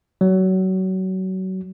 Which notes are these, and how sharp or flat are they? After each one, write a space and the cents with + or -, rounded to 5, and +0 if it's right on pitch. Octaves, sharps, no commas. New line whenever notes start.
F#3 +25